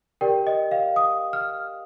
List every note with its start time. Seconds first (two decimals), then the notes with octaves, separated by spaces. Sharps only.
0.21 G4 A#4 D5 G5
0.47 D#5
0.71 F5
0.96 D#6
1.33 F6